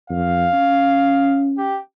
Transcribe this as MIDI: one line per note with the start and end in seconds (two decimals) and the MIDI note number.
0.10 0.48 41
0.10 1.48 77
0.54 1.78 61
1.58 1.79 67